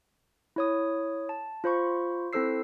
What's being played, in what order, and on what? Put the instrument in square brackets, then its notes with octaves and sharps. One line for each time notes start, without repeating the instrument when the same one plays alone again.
[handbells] E4 C#5 D#6
A5
F4 C5 B5 C#6
C4 E4 A4 C5 E6 C7